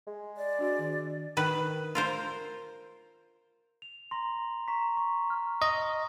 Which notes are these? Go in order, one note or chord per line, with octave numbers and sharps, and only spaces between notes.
G#3
D5
D4 F#4 G#5
D#3
D#3 B4
F4 A#4 C5
F7
A#5 C6 A#6
A#5 C#6 B6
C#6
C#6 F6
D#5